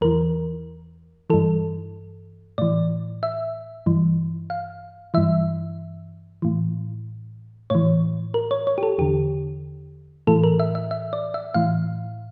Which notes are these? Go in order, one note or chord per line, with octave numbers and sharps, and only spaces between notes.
E2 E3 A#4
G2 E3 A4
A2 E3 D5
E5
G2 E3
F5
G2 E3 E5
A2 E3
A2 E3 C#5
A#4
C#5
C#5
G4
A4
E2 D3 G4
A2 E3 A4
A#4
E5
E5
E5
D5
E5
A2 E3 F5